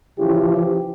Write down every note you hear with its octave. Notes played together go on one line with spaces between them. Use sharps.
C#3 E3 F3 E4 G4